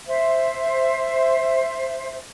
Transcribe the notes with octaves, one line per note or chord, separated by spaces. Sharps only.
C5 E5